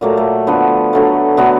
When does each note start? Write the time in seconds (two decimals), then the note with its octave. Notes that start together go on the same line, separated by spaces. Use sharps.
0.01 A#2 F#3 A3 A#3
0.17 A3
0.47 D3 F3 A3 B3
0.93 D3 F#3 A3
1.37 D3 F#3 A3 B3